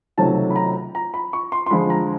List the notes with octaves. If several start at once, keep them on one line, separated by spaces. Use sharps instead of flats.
C#2 C3 D#3 F#3 A3 A5
B5
A#5
A#5
B5
C#6
C6
C6
F2 D3 F3 G#3 B5
A#5